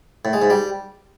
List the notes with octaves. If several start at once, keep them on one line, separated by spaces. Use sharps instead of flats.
A2
G#3
G#2
G3